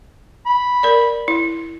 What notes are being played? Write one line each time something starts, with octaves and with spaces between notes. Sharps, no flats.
B5
A#4 D5
E4